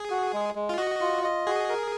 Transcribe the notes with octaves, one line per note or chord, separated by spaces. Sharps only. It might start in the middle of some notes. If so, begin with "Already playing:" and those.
Already playing: G#4
F#4
G#3
G#3
F4
F#4 D#5
F4
D#5
F#4 G#4
A#4